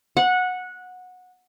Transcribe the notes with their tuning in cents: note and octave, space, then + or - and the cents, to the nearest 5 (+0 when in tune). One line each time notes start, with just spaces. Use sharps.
F#5 -15